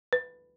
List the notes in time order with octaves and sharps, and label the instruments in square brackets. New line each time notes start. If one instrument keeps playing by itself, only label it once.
[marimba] B4